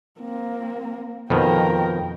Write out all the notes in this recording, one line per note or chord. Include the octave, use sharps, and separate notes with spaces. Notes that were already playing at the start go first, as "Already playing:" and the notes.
A#3 C4
F2 B2 D#3 A#4 G5